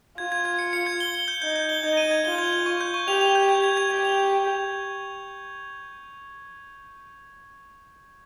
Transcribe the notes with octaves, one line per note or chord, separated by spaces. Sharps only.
F4 G#6
G#6
G#6
C#7
C#7
G#6
G7
G7
G6
D#4 G6
G6
G7
D#4 G#6
D#7
G#6
F4 G7
G#6
G#6
C#6
G6
C#6
G4 F7
F7
G6
G#6
G#6
G#6
G4 G#6
F7